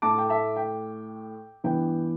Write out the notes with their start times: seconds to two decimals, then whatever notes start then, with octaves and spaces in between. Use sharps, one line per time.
0.02 A2 A3 A5 D6
0.18 G5
0.29 E5 A5
0.56 G5
1.64 G2 E3 B3 G5